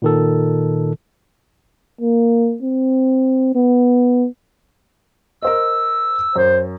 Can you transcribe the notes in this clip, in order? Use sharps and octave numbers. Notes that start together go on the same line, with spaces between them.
A#2 D#3 A4
A#3
C4
B3
A#4 C5 D#5 E6
F#2 C5